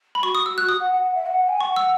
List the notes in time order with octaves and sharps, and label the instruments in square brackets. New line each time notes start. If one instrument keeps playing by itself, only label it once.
[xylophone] B5
[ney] F#4 [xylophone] C#6
[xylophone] D#6
E6
F#6
D#6
[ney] F#5
F#5
F#5
E5
F#5
F#5
G#5
[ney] F#5 [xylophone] C#6
[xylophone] E6